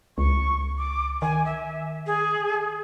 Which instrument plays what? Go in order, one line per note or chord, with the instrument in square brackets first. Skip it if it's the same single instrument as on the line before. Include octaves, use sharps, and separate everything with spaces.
[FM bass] C#2 [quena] C#6
[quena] D6
[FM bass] D#3 [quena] G#5
[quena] E5
G#4